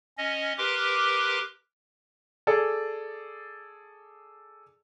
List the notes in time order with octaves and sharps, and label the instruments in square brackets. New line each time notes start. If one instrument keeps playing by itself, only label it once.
[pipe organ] C#4 D#5
G4 A#4 B4 C6 D6
[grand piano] G#4 A4 D5